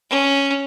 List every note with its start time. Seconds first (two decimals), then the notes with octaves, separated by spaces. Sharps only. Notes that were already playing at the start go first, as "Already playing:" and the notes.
0.10 C#4